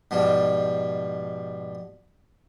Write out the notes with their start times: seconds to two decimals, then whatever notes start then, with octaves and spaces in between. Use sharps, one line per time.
0.11 G#2 B2 F3 G3